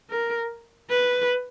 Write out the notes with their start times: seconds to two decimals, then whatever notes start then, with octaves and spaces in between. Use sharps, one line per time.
0.10 A#4
0.89 B4